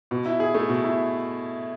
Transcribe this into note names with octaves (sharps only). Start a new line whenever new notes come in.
B2
E4
G#4
A3
B2
E4